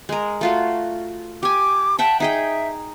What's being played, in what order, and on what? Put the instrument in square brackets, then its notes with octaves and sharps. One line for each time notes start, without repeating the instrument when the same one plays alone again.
[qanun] G#3 A#4
A3 F4 F#4
[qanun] G4 G#5 [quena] D6
[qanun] E5 F#5 G5 [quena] A5
[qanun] D#4 G#4 G5 [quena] E5